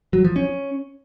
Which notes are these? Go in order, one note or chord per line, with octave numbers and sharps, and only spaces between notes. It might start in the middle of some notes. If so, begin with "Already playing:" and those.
F#3
F3
C#4